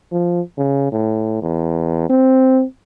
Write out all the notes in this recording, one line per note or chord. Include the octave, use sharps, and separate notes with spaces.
F3
C#3
A2
E2
C4